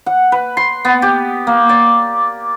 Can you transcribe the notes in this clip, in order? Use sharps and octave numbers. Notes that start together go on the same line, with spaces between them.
F#5
B4
C6
B3
G4
A#3
D5